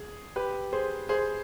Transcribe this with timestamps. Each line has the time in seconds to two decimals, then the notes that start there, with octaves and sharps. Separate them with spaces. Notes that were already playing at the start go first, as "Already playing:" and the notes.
Already playing: G#4
0.36 G4 B4
0.73 G#4 C5
1.09 G#4 C5